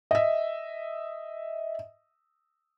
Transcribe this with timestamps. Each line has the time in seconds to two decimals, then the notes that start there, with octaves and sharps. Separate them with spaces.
0.11 D#5 E5